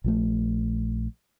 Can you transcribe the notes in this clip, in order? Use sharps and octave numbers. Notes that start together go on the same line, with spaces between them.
A#1 F3 A3